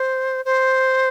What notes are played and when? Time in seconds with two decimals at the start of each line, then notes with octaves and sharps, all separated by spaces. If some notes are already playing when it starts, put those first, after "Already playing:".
Already playing: C5
0.45 C5